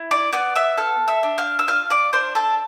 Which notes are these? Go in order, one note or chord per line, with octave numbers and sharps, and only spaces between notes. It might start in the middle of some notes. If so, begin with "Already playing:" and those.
Already playing: E4
D5 D6
B3 D5 D6
E5 E6
A4 F5 F6
E5 E6
D4
F5 F6
E6
F4 F5 F6
D5 D6
D4 C5 C6
A4 A5